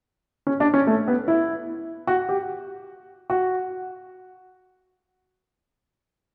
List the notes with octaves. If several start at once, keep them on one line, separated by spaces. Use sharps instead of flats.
C#4
D4
C#4
A3
B3
E4
F#4
G4
F#4